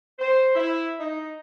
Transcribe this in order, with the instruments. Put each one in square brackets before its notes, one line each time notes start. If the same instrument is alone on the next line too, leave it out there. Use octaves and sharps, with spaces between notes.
[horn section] C5
E4
D#4